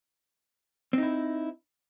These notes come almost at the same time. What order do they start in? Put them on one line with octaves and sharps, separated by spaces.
C4 D#4 E4